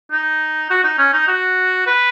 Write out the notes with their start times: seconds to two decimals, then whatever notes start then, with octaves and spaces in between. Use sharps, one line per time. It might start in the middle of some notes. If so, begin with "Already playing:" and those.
0.12 D#4
0.70 F#4
0.84 D#4
0.98 C#4
1.13 D#4
1.28 F#4
1.87 B4